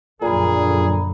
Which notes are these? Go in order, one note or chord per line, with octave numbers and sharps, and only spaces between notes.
A#1 F#2 A#2 D3 G#4 A#5 B5